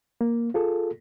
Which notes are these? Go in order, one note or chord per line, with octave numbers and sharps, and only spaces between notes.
A#3
F4 G#4 A4